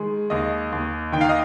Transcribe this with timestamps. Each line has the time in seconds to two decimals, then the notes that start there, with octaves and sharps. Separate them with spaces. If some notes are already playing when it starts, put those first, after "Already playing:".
Already playing: D#3 G#3
0.30 D#2 D#5
0.72 D#2
1.12 D#3 G5
1.21 F5
1.29 D#5